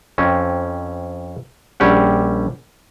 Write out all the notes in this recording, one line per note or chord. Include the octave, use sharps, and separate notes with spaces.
F2 C4 C#4
A#1 D3 G3 C#4 G4 F#5